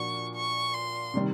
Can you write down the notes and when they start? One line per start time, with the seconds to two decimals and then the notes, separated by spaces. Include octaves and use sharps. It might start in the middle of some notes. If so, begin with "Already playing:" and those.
Already playing: A#2 F3 A#3 D4 F#4 C#6
0.35 C#6
0.74 C6
1.14 C3 D#3 G3